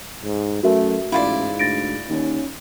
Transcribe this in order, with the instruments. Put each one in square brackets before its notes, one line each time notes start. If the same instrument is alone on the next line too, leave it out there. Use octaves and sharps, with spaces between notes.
[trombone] G#2
[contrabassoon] F#2 [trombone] A3 [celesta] F#4 A#4 E5
[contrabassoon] A1 [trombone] G#2 [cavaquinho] E4 F4 D5
[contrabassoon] D2 [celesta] A6 A#6 D7
[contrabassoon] D#2 [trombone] C#4